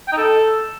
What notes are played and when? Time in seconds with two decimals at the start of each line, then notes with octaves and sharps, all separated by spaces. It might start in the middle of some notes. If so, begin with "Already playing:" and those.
0.07 G5
0.12 D#4
0.17 A4